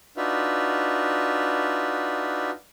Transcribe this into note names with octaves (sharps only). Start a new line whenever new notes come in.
D4 D#4 F4 F#4 B4 E5